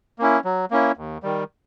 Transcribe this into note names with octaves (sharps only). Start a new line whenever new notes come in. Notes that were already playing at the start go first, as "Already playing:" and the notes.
A#3 C#4 E4
F#3
A#3 C#4 E4
D#2
D#3 G3